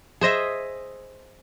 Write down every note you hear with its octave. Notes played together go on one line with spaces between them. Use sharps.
G#4 C5 D#5 E5